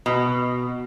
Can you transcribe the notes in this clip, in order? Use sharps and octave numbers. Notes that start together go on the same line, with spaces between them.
B2